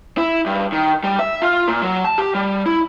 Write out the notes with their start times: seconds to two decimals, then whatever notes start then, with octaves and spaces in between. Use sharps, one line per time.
0.17 E4
0.46 G2
0.72 D#3
1.04 G3
1.19 E5
1.42 F4
1.67 A#2
1.82 F#3
2.05 A5
2.18 G4
2.34 G3
2.66 E4